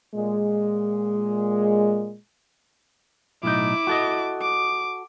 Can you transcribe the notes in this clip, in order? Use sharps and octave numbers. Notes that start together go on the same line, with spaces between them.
A#2 G#3
B1 A2 D#4 E4 D6
F#4 A4 D#5
D6